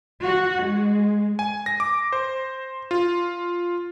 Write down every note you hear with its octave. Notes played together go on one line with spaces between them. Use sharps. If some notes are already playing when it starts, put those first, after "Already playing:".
F#4
G#3
G#5
A#6
D6
C5
F4